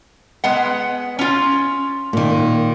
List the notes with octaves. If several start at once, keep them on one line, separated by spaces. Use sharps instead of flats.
G#3 B3 F#5
C#4 F4
A#2 D#3